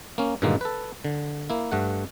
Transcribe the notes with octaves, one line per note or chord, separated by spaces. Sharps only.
A#3 C#4
G2 A#2 D3 D#3 G#3 A#3
A4 B4
D3
A#3 E4
G2 A3 F#5